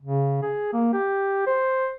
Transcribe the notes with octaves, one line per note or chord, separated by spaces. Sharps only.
C#3
G#4
A#3
G4
C5